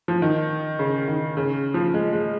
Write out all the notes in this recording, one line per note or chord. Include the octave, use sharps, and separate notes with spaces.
F3
D#3
C#3
D#3
C#3
F3
G#3
G#3